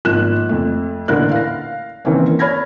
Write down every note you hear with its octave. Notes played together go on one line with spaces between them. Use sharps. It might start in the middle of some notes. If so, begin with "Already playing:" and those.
G#1 F3 A#3 F#6 E7
F2 A3
A1 A#2 D3 E4 A#4 F#6
F5 A#6
D#3 E3 A#3 C4 C#4
C#5 B5 F6 G#6 A#6